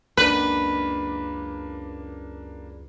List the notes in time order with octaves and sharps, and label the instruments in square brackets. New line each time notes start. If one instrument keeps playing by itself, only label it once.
[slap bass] C#2 F#2 [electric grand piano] A#3 D4 [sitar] B4